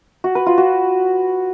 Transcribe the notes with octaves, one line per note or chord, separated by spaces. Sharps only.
F#4
B4
F4
F#4